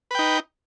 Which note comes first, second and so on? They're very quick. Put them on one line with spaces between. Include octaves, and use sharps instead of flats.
B4 G5 D#4